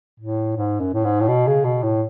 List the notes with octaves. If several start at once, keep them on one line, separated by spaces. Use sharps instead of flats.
A2
G#2
F#2
A2
G#2
A2
B2
C#3
B2
A2